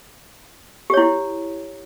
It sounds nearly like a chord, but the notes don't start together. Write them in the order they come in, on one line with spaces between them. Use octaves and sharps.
G4 C#5 E4